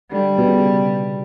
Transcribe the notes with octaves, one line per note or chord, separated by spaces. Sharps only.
D3 G3
B2
C#3